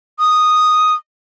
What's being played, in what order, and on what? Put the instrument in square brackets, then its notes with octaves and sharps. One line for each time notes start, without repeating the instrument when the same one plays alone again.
[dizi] D#6